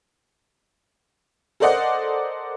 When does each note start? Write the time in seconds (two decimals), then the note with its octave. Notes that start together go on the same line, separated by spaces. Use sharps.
1.60 A4 A#4 C5 D5 D#5 F#5